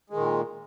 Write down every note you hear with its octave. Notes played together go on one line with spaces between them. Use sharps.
A#2 D#3 G#3